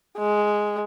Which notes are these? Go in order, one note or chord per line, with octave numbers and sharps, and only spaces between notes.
G#3